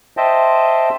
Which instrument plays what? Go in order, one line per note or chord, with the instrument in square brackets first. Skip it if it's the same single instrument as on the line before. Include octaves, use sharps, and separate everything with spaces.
[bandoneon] C5 D#5 E5 G5 A5